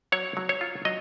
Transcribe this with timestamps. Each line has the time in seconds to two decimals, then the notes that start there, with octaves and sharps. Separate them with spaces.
0.12 F#3 C#5
0.37 F#3
0.49 C#5
0.61 F4
0.85 F#3 D#5